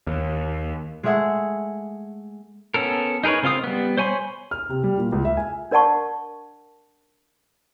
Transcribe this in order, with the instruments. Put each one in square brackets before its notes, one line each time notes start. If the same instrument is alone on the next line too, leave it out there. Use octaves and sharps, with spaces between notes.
[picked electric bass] D#2
[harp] G#3 A3 G#4 E5 F#5
[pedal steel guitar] B3 C#4 A4 A#4
D#4 G#4 A#4 B4 C#5
C#3 C4 F4 F5 D#6
G3 B3
C5 C#5 G#5 B5 C6
[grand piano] F6
C3
G3
A#2
C#2
E5
G#5
[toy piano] D4 A#4 D5 F#5 A5 C#6